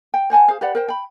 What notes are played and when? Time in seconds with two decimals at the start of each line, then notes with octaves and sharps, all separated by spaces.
0.14 G5
0.30 C5 F#5 G#5 A5
0.48 G#4 C5 F5
0.61 G4 B4 D5 F#5
0.75 A#4 C5 G5
0.88 G5 B5